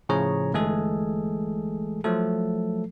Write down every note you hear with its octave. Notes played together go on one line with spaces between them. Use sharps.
A2 C#3 F3 G#4 C#5 A#5
G1 E3 G#3 A3 G#4 A4
F3 F#3 A3 A4